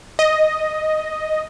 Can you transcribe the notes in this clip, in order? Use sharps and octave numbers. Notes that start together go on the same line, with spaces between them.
D#5